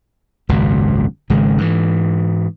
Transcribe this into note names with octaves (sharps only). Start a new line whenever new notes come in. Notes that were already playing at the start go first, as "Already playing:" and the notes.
G#1 C#2 F#2 B2
G#1 C#3 G#3
G#2 E3